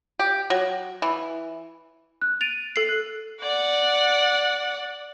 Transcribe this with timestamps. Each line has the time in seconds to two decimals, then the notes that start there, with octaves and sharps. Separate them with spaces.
0.19 G4
0.50 F#3
1.02 E3
2.22 F#6
2.41 A6 D7 D#7 F7
2.76 A4 C7
2.89 F#6
3.40 D5 F#5